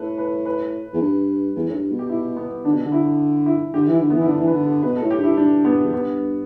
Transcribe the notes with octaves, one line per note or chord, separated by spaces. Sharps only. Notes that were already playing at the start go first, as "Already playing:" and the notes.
Already playing: A2 A4 B4
B4
B4
E2
G2
E2
A2
G2
B2
G4
E4
B3
D3 D4
B2
D3
E4
E4
D3 G4
E3 E4
D3
B3
E3
E4
D3 D4
E3
B4
D3
A4
B2 B4
A4
A2
G4
G2 E4
G2 D4
B3
E2
G2 B3